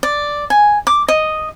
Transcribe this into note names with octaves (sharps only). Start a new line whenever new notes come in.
D5
G#5
D6
D#5